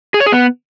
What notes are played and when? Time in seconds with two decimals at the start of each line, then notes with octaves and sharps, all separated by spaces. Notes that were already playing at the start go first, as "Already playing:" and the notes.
0.14 G#4
0.20 C#5
0.26 G#4
0.32 B3